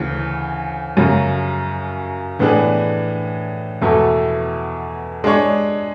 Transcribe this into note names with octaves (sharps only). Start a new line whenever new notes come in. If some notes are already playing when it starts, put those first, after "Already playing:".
Already playing: D2 C#3 E3
F#2 C#3 F#3
A2 E3 B3 D4 G#4
E2 B2 A3 E4 A4
G#3 D4 G#4 C#5